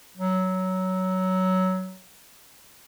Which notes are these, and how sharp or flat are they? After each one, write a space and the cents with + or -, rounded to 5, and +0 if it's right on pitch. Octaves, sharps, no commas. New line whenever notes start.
F#3 +10